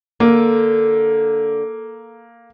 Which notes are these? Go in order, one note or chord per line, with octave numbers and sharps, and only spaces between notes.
D3 A#3